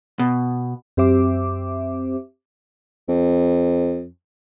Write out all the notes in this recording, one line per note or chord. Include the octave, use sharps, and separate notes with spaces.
B2
F#2 C4 G4 C5 E5 D6
F2